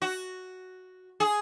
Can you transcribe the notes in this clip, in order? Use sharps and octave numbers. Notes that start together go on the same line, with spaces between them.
F#4
G#4